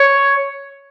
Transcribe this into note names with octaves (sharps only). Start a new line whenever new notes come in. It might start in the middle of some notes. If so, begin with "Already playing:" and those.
Already playing: C#5